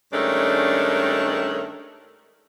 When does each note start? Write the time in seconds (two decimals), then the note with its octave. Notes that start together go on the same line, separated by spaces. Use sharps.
0.13 G2 D#3 G#3 A3 C#4 D4